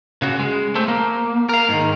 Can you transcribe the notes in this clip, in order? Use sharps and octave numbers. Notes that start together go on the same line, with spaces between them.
C#3 F#4
G#3
A3 C4
A#3
A#4 F5
G#2 D#3